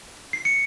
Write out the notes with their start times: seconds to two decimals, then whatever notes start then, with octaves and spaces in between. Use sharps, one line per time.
0.33 C7
0.45 C#7